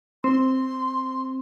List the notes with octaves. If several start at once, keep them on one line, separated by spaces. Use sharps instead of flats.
C4 C6